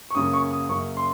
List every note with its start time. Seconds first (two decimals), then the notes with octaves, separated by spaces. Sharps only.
0.10 C#6
0.15 F#2 C#3 F#3 A#3 D#6
0.34 C#6
0.51 D#6
0.69 F#2 C#3 F#3 A#3 C#6
0.97 C6